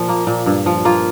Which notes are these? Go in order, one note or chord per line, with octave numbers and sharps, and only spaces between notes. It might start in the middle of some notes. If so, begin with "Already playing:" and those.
Already playing: A#2 F3
A#3
A#2
G2
F3
A#3 F4